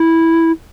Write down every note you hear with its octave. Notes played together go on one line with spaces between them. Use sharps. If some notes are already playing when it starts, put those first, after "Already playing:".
Already playing: E4